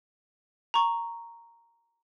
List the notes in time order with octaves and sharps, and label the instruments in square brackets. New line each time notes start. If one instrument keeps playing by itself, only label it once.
[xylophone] A#5 C#6